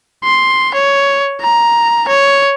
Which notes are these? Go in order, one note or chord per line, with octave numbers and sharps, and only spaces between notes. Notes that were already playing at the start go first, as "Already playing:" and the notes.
C6
C#5
A#5
C#5